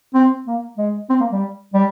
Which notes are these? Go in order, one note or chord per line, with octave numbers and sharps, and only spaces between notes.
C4
A#3
G#3
C4
A#3
G3
G3